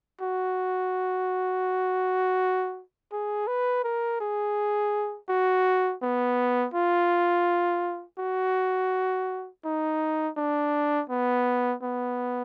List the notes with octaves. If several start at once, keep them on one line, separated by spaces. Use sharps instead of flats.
F#4
G#4
B4
A#4
G#4
F#4
B3
F4
F#4
D#4
D4
B3
B3